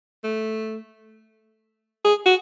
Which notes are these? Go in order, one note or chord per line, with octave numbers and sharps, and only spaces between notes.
A3
G#4
F#4